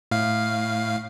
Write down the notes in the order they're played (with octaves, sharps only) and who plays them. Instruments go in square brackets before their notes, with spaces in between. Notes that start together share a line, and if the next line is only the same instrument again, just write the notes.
[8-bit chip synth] A2 F5